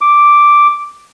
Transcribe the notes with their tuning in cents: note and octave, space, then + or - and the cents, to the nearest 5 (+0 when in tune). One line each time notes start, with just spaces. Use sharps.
D6 +0